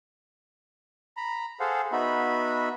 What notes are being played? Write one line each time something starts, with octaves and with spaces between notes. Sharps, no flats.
A#5 B5
G#4 A4 C5 F5 F#5
B3 D#4 F#4 E5 B5